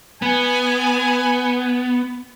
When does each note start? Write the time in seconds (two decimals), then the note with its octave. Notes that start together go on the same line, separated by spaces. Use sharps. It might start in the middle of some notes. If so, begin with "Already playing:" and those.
0.22 B3 G#5